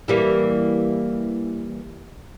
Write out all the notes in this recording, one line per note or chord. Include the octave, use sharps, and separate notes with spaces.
E3 G3 A#3